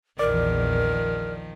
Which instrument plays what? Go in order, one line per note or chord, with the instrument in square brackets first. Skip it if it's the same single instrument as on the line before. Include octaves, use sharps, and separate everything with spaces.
[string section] A#1 E2 [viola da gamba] D#3 F3 [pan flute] A#4 [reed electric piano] D5